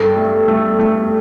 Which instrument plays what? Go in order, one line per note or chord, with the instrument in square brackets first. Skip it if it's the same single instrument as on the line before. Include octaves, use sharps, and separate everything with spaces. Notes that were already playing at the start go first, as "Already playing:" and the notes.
Already playing: [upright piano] G2 [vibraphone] A4
[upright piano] A3
A3
A3